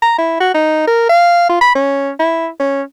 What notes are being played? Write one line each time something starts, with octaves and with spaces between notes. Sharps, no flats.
A#5
E4
F#4
D#4
A#4
F5
F4
B5
C#4
E4
C#4